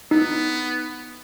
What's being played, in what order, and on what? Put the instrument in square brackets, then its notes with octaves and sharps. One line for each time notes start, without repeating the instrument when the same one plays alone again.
[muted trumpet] B3 [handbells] D#4